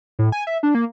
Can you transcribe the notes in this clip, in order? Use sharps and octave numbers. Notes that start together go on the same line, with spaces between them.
A2
G#5
E5
D4
A#3